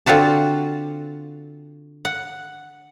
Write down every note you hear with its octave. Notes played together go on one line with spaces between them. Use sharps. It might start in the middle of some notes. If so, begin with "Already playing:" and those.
D3 C4 F4 F#4 A5
F#5